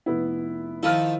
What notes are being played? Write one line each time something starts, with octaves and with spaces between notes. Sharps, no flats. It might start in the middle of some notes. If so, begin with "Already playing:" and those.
F1 B3 E4
D#3 F3 E4 A4 F6